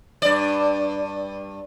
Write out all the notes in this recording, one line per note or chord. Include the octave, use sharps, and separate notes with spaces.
G2 D5